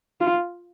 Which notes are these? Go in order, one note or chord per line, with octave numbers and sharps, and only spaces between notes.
F4